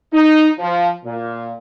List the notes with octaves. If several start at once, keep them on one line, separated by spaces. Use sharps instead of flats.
D#4
F3
A#2